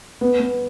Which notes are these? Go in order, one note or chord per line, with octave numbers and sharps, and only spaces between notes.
B3
B3